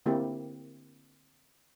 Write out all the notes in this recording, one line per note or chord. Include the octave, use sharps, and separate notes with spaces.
D3 A#3 C4 E4 G4